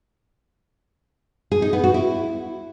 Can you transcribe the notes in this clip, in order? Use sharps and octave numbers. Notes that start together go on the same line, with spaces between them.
G#4
D#4
B3
F#4
E4